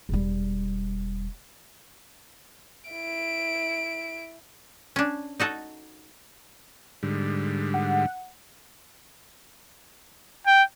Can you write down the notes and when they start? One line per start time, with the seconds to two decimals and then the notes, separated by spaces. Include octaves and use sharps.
0.09 E1 G3
2.90 E4 D7
4.96 C#4 D4
5.40 D#4 F#4 A4 D#5
7.03 G#2 D3 G3
7.74 F#5
10.47 G5